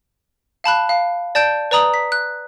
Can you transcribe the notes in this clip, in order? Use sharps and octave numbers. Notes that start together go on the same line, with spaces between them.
F5 A5 B5 F#6
F5
D5 A5 G6 D7
B4 D5 A#5 D#6 F#7
B6
F#6